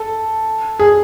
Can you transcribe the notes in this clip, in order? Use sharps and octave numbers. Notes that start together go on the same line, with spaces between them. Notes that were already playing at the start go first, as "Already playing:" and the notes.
Already playing: A4
G#4